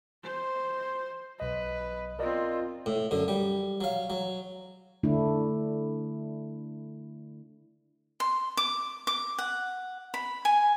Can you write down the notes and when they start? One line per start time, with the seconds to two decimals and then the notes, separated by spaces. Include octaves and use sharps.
0.24 C5
1.40 B1 B4 D#5
2.19 C4 F4 A#4 D5 D#5
2.86 A2
3.11 F#2 D3
3.28 G3
3.81 F#3 F5
4.10 F#3
5.03 D3 A3 D4 E4
8.20 C6
8.57 D6
9.07 D6
9.38 F#5
10.14 B5
10.45 G#5